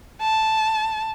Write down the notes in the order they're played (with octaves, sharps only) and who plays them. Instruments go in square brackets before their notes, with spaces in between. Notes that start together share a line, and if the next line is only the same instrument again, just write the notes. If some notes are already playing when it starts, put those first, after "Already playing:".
[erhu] A5